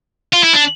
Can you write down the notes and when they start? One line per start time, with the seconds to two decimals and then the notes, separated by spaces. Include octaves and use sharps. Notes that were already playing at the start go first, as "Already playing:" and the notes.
0.33 F4
0.43 E4
0.53 D4